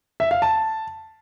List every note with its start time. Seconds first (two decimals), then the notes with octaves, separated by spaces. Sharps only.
0.20 E5
0.31 F5
0.42 A5